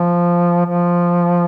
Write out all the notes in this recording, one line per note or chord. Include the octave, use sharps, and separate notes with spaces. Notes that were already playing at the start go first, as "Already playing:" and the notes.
Already playing: F3
F3